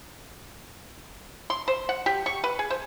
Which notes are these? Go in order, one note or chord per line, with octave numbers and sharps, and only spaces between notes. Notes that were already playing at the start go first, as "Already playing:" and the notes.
C6
C5
F#5
G4
C#6
B4
G#4
C5